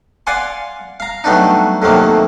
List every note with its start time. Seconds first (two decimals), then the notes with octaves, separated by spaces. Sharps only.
0.27 D5 F5 F#5 G#5 C6
1.00 F5 A#5
1.24 F#3 G3 A3 B3 D4 D#4
1.82 F2 A2 C3 D#3 F#3 A#3